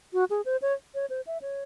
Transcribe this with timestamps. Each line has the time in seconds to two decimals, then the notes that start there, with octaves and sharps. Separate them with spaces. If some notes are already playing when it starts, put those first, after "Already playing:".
0.13 F#4
0.30 G#4
0.45 C5
0.62 C#5
0.95 C#5
1.10 C5
1.27 E5
1.42 C#5